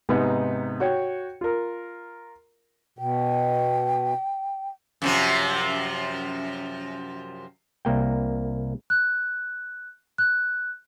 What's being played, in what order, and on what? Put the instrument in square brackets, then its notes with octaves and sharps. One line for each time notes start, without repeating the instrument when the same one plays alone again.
[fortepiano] G#2 C3 B3 D#4
F#4 C#5 G5
F4 A#4
[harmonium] B2 [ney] G5
[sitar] F#2 C3 F3
[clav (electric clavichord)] C2 A#3 G5
[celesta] F#6
F#6